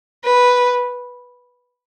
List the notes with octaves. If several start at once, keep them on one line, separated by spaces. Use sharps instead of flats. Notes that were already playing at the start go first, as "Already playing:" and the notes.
B4